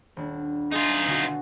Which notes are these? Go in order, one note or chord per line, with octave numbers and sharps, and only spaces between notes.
D#1 D4
D#4 F4 G#4
B2 D3 F#4